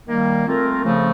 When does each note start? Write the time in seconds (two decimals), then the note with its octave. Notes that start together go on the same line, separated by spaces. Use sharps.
0.06 D#3 G3 A#3
0.45 A3 C4 F4 A#4
0.84 C#3 F3 A3